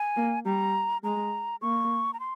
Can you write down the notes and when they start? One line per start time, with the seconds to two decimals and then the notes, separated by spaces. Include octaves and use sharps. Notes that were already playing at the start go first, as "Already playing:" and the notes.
Already playing: G#5
0.16 A#3
0.45 G3 A#5
1.03 G#3 A#5
1.62 A#3 C#6
2.14 A#5
2.20 C6